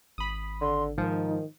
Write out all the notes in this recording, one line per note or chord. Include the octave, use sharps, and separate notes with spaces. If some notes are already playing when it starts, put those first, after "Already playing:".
G#1 B5 D#6
D3 C6
G#2 D#3 F3 D#4